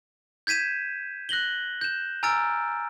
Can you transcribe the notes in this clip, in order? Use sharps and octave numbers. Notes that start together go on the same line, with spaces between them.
G6 G#6 B6 D#7 E7
F#6 A#6 F#7 G7
G6 E7
G#5 A#5 E6 F6 A6 D7